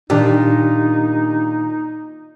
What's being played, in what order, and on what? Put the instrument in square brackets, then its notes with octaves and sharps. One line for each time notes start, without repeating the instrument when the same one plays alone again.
[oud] A#2 [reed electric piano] D#3 D4 G4 [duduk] D#4